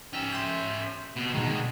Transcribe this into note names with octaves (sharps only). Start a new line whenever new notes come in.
C#4 E5 G5
C6 G6 B6
B2 C4
B2 D3 D#3 G#3